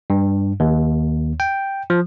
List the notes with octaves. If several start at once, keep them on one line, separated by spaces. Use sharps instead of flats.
G2
D#2
G5
F3